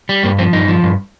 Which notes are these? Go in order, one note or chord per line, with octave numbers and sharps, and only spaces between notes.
G3
G2 A#3
F3 C4
G2 D#4
F3
G2